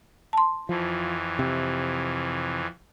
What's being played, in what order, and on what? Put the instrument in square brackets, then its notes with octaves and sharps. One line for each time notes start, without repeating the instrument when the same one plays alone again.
[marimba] A5 C6
[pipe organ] F2 E3 [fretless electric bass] F3
[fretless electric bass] C3